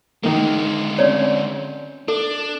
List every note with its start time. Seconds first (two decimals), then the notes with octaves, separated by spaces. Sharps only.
0.23 D3 D#3 G#3 A#3
0.99 C4 C#4 C#5 D5
2.08 D4 A4